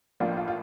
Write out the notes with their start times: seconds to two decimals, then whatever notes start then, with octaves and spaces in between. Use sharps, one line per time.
0.20 A1 A2 F3 A#3 D4 F4
0.37 F4
0.48 F4